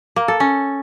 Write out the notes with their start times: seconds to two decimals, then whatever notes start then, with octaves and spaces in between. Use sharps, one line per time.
0.16 A#3
0.28 A4
0.40 C#4